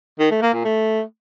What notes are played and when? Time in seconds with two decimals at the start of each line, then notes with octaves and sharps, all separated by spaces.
0.19 D#3
0.31 A3
0.42 A#3
0.53 A#2
0.65 A3